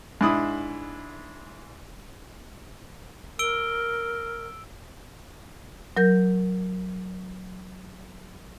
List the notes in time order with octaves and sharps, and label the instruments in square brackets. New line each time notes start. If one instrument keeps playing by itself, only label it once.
[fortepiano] G#2 D4 E4 D#6
[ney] A#4 [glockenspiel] E6 D7 G7
[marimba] F#3 A#4 G6